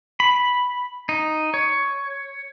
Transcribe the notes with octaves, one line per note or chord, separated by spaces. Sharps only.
B5
D#4
C#5